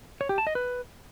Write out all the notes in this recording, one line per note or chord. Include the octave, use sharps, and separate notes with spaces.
C#5
G4
A5
D#5
B4